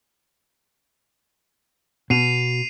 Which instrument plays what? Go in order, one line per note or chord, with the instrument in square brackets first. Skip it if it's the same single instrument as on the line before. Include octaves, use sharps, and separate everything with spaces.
[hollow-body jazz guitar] B2 [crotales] C7 D#7 F7